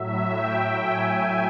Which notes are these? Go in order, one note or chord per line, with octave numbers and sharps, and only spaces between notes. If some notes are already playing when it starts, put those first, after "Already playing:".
Already playing: A2 F#3 E5
G5
G#5